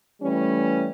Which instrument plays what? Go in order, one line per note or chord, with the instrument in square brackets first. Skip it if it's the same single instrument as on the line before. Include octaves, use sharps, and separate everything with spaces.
[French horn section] E3 G3 A3 C#4